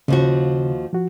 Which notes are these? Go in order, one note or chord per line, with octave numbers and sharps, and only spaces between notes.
D#2 C#3 F3 F#4
F3 F#4